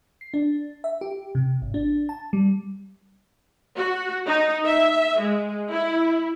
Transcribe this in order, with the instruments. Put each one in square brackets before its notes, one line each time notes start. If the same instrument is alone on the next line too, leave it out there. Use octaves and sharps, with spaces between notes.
[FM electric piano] C7
D4
E5
G4
C3
G#1
D4
A5
G3
[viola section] F#4
D#4
E5
G#3
E4